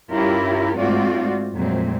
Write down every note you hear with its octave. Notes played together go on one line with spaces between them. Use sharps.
G2 C#4 E4 F4 G4 A#4
G#2 A3 C4 F4 F#4 D5
F2 A#2 F#3 G#3 A3 C4